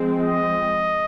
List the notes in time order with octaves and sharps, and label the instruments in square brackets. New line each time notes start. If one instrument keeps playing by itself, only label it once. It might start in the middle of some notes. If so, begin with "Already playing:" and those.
Already playing: [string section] F3 G#3 C4
[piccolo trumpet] D#5